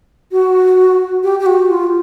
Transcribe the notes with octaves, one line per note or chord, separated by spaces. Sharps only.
F#4
G4
G4
F#4
F4